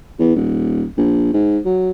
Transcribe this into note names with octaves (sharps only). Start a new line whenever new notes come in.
E2
D#1
A#1
G#2
F#3